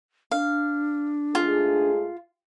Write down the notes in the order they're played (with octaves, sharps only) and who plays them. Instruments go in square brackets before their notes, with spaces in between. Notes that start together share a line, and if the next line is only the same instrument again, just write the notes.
[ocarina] D4 [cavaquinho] F5
[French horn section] G#2 A3 G#4 [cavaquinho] F4